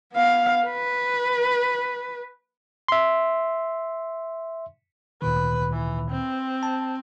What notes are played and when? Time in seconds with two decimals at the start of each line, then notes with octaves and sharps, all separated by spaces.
0.13 B3 F5
0.64 B4
2.88 E5 C6
5.22 D2 A#2 D#3 B4
5.72 E3
6.11 C4
6.63 A5